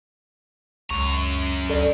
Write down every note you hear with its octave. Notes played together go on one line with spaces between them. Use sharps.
C#2 F#2 A#5 C#6
D2 A4 D5